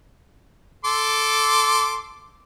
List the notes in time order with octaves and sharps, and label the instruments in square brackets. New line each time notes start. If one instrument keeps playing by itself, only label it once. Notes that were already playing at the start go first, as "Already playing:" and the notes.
[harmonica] A4 C6 D6